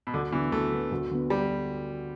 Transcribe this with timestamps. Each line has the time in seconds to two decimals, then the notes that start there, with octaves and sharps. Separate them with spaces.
0.07 B2
0.14 D2 D3
0.32 D3 E3 B3
0.52 D2 A3
0.71 D3 B3
0.92 D2
1.11 D3 B3
1.30 G3